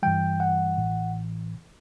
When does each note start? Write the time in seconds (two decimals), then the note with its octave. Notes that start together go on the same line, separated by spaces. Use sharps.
0.03 G2 E3 G3 G5
0.40 F#5
0.77 A1 A2 E3